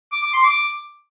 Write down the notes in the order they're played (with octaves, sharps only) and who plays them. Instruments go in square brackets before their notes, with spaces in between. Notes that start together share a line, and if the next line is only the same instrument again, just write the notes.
[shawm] D6
D6
C6
D6